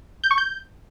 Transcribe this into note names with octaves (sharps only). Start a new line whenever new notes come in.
G6
C#6
G6